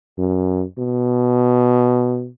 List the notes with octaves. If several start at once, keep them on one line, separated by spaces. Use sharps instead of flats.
F#2
B2